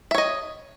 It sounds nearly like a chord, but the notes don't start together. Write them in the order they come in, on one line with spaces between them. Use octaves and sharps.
E5 C#5 D#5